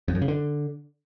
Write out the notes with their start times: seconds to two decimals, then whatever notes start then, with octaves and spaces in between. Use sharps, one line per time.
0.08 F2
0.15 F#2
0.21 C#3
0.28 D3